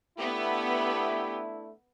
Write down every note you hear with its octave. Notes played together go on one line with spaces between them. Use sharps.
A3 B3 D4 E4 G4